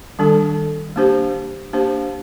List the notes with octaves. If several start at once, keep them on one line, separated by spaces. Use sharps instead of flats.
D#3 G3 D4 A4
A#3 D4 G4 C5
A#3 D4 G4 C5